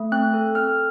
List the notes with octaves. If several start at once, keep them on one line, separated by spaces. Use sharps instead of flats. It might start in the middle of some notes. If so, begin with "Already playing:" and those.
Already playing: A3
C4 F#6
A4
C4 F6